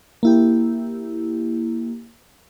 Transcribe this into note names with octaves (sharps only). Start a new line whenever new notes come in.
A#3 E4 G4